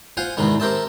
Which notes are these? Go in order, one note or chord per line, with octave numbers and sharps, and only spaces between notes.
F4 C5 F5 F#5 G#5
E2 G#2 C3 D#3 G#3 B3
C4 G4 A#4 C5 E5 A5